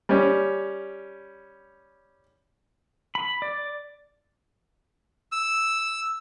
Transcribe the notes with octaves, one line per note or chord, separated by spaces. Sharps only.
G3 C#4
B5
D5
E6